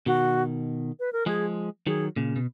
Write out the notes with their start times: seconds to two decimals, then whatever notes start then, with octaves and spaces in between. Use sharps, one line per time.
0.06 B2 D#3 F#4
1.00 B4
1.13 A#4
1.26 F3 G#3 G#4
1.87 D#3 F#3 G#4
2.16 A#2 C#3
2.36 B2